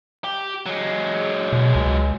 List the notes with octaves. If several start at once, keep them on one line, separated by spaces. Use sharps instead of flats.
G4
F#3 G#3
B2
C#2